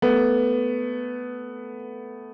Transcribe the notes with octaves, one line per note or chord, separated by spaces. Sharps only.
A3 B3